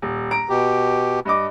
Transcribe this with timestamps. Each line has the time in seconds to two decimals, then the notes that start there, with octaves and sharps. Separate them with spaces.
0.02 D#1
0.31 A#5 D7
0.49 B2 G4
1.25 G2 D#5 D6